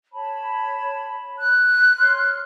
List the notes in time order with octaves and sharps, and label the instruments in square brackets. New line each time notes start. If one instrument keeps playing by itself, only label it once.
[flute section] C#5 A5 B5
[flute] F#6
[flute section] C#5 C6 F6